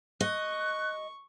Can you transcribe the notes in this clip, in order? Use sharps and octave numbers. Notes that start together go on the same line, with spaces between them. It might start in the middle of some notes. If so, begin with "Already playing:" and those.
D#5 C#6 F#6